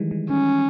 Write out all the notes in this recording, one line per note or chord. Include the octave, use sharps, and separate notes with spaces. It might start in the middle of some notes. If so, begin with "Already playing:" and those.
Already playing: D#3 E3 G3 G#3
E3 G#3
D#3 G3 C#4